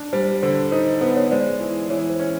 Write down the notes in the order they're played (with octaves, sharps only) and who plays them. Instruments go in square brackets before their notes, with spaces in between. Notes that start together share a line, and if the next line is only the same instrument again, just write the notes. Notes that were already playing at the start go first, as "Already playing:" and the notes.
Already playing: [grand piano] D4
[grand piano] G3 [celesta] C5
[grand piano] D3 [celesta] C5
[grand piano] D#4 [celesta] C5
[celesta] C5
[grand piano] B3 [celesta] C5
[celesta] C#5
[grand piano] G#3 [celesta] C5 D5
[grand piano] E3
[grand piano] E3 [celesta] C#5
[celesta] C5
[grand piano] C#4